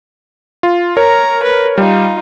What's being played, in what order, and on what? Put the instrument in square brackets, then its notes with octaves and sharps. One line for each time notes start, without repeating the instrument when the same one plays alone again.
[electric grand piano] F4
[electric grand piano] A#4 C#5 [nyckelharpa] A#5
[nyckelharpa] B4
[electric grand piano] G3 [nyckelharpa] D#4 F4